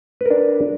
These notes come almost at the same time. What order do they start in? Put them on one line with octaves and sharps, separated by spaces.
B4 A#4 D4